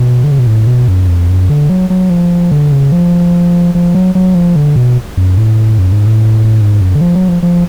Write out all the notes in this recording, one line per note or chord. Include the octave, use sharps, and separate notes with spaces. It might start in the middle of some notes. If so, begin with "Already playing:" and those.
Already playing: B2
D3
C#3
B2
A2
B2
F#2
F2
F#2
D3
F#3
F#3
F3
D3
C#3
F3
F3
F#3
F#3
F3
D3
B2
F#2
A2
F#2
G#2
A2
G#2
F#2
D3
F3
F#3
F3
F3